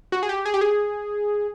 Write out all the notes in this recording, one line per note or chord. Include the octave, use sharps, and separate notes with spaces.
F#4
G#4
G4
G#4
G4
G#4